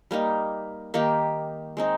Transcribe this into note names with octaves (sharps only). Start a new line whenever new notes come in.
G3 A#3 D#4
D#3 A#3 D#4 G4
G#3 C4 D#4